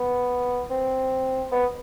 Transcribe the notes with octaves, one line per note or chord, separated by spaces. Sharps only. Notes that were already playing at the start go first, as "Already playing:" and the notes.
Already playing: B3
C4
B3